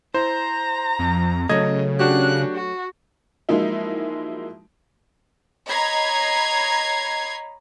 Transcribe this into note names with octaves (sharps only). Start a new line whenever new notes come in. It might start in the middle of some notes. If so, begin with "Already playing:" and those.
E4 C5 A#5
F2
C#3 F#3 A3 D#5 G#6
D4 F#4 G4 F#6
F#4
F3 F#3 G#3 A#3 D#4 E4
C#5 D#5 A#5 B5 G#6 C7